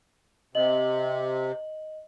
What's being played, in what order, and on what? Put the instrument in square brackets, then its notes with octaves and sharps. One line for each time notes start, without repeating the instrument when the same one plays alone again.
[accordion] C3 [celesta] D#5 F#7